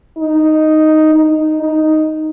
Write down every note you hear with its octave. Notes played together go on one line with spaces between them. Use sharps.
D#4
D#4
D#4